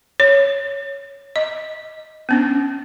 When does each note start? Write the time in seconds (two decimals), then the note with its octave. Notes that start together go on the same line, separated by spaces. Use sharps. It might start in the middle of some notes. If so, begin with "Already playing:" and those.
0.20 C#5
1.36 D#5
2.29 B3 C#4 D4